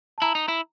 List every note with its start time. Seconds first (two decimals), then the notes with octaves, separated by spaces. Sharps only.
0.18 A5
0.22 E4 A#5
0.35 D#4
0.48 E4